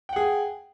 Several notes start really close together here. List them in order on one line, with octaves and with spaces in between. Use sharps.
G5 F#5 G#4